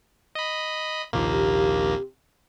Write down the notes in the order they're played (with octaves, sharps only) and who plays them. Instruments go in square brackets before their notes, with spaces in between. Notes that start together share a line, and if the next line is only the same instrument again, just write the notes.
[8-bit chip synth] D#5 B5
[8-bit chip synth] A#1 D#2 A#3 [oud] C3 F4